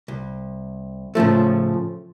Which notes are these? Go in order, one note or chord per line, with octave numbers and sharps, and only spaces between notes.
C2
A2 C#3 F3 A3